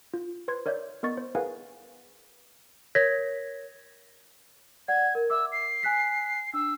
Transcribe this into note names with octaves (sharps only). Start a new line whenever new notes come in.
F4
B4 C5 C6 G#6
A#4 C#5 D5 E5 G6
B3 A#4 D#5 C#6 A6
C5
G#4 A#4 B4 F5 F#5 G#5
A#4 C#5 G#6 A#6 B6
D5 F#5 G#6
A#4
E5 D6 E6
C7
G#5 F#6 B6
D4 E6